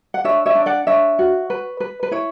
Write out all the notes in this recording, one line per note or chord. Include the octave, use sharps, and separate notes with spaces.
F#5
D4 C#5 E5
C#5 E5
D4
D5 F#5
D4 C#5 E5
F#4
B4
B4
B4
E4 C#5